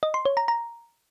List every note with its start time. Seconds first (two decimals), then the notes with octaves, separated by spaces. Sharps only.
0.03 D#5
0.14 C6
0.25 C#5
0.37 A#5
0.48 A#5